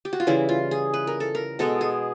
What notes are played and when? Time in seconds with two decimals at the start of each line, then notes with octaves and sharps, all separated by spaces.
0.05 G4
0.13 F#4
0.20 F4
0.27 C#3 E3 G3 E4
0.49 F4
0.71 G#4
0.94 B4
1.07 A#4
1.20 A4
1.35 A#4
1.59 B2 G#3 B3 A4
1.81 G#4